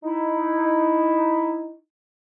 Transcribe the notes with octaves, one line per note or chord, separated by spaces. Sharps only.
D#4 E4